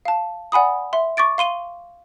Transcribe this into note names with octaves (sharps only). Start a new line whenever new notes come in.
F5 A5
D5 F#5 G#5 B5 D#6
E5 C6
C#6 D6 A6 D7
F5 C6 D#7 G7